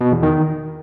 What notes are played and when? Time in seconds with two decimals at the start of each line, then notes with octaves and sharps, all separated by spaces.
0.01 B2
0.12 E2
0.23 D#3